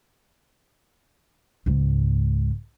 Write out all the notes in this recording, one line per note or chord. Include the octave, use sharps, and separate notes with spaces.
C#2 G#2